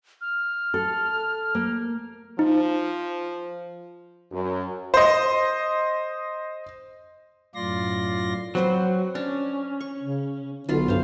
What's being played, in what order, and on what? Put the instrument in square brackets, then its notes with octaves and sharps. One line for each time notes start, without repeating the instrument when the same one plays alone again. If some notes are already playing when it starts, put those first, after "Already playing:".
[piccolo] F6
[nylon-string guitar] A4
A#3
[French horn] F3 [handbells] D#4
[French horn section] F#2
[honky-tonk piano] C5 D#5
[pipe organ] F#2 A2 F4 D5 C6 A#6
[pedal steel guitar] F#3 [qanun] C4 B4 C5
[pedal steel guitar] C#4 [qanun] D4
[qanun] C#6
[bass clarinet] C#3
[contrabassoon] B1 [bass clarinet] D3 [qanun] F4 B4
[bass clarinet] G2 [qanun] C5 F5